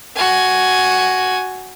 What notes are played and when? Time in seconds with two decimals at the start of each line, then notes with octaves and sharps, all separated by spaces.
0.16 F#4 G#5